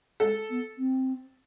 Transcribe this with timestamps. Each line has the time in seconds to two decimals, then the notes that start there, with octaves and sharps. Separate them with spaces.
0.20 G#3 A4
0.49 B3
0.77 C4